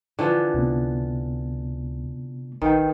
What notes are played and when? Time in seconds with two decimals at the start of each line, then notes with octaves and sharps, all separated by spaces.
0.19 D3 E3 F3
0.54 C#2 C3 B3
2.62 A#1 D#3 A#4 B4 G5